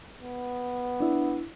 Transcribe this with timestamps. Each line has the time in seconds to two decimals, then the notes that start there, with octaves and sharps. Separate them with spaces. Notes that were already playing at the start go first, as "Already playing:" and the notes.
0.21 B3
1.00 D4 E4